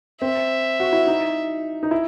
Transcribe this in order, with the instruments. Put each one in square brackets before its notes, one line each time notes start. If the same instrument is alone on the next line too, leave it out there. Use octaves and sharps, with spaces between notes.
[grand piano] C4 [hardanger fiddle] E5
[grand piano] F#4
E4
D#4
D#4
E4